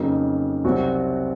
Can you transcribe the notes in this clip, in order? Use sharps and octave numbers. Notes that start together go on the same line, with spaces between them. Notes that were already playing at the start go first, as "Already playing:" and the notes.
Already playing: F2 C#3 F#3 A#3 D#4
C2 C3 F#3 C4 F#4